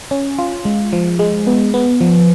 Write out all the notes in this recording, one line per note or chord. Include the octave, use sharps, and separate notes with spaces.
C#4
F4
G#3
F3
G#3
B3
B3
F3